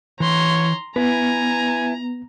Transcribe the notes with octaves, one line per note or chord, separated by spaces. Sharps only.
E3 C#5 A#5 C6
B3 E4 B4 G#5 A#5